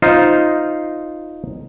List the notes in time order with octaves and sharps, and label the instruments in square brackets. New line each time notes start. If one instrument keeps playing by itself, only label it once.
[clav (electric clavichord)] D#4 F4 C5